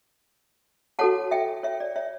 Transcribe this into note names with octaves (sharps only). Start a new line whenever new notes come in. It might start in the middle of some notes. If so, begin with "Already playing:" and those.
F#4 A4 C#5 F#5 A5
E5 G5
C#5 E5
D5
C#5 E5